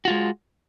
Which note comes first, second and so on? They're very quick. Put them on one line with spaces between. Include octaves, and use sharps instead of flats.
F#4 F4 G#3